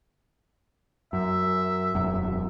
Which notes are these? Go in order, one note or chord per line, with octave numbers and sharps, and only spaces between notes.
F#2 E5
E1 F#2